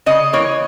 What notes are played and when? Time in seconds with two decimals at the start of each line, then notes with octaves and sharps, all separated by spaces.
0.06 C#3 D#5
0.33 E3 A#3 C#5